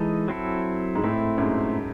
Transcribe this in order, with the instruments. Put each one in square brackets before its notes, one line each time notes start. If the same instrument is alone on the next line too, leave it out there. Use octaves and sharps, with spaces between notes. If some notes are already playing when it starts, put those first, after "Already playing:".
Already playing: [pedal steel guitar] E3 G#3 D#4 A4 D#5
F#3 C4 E4 A4
[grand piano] G#2
[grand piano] A2 [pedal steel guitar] A3 C4 E4
[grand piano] F#2
G#2